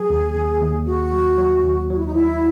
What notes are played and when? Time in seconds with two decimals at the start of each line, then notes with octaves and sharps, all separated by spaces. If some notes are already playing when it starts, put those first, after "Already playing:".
Already playing: F#3 G#4
0.10 D#2
0.35 D#2
0.61 D#2
0.86 D#2 F#4
1.13 F#3
1.38 F#3
1.63 D#2
1.90 F#3 F#4
1.97 E4
2.05 D#4
2.14 F#3 E4